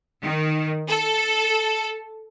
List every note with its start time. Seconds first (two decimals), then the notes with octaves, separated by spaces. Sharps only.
0.21 D#3
0.88 A4